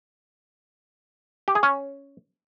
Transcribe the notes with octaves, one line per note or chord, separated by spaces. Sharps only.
G4
G#4
C#4